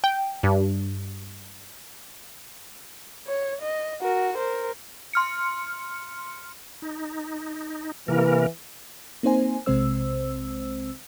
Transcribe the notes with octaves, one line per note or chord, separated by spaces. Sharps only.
G5
G2
C#5
D#5
F#4 A#4
A#4 C5
C6 F6 C#7
D#4
C3 E3 A#3 A#4
A#3 C4 D#4 C5 G#5
B1 C3 G#3 C4 C5 E6